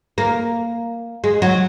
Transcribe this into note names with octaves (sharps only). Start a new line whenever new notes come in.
A#3
G#3
F#3